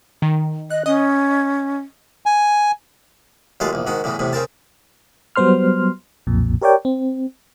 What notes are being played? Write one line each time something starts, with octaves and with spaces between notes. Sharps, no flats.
D#3
D#5 F#6
C#4 D#5 D#6
G#5
D#2 F#3 G#3 A3 F4 F5
A#1 E2
G#2 D#3 F#4
E2 A2 C#3 E3
E2 A2 C3
C#3 C4 A#4 A5
F#3 G3 B3 C5 C6 F6
B1 F2 A#2
G4 A#4 C#5 D5 G5
C4